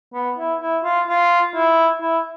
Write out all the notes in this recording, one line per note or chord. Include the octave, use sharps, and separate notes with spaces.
B3
E4
E4
F4
F4
E4
E4